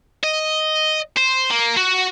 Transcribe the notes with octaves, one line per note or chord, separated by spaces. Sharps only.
D#5
C5
A#3
F#4